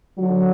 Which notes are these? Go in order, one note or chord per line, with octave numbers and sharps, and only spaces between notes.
D3 F#3 F#4